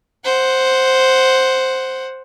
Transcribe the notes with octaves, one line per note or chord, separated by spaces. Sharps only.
C5 F#5